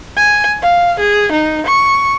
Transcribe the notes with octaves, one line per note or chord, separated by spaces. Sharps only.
G#5
F5
G#4
D#4
C#6